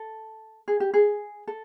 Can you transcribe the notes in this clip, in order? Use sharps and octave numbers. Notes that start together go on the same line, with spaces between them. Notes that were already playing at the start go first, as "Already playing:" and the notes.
Already playing: A4
G#4
G4
G#4
A4